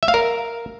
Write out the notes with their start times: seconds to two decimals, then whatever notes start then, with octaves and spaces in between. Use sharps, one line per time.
0.03 E5
0.08 F5
0.14 A#4